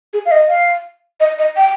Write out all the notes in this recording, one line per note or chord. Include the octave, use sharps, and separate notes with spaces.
G#4
F5
D#5
F5
D#5
D#5
G5